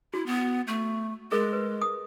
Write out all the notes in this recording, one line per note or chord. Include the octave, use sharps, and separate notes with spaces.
E4 F#4
B3
A3
G#3 G#4 A#4 D#5
B4
D#6